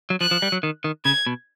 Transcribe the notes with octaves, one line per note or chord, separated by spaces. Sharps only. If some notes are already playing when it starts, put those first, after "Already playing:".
F#3
F3 F#6
F3
G3
F#3
D#3
D#3
C#3 G#6
B2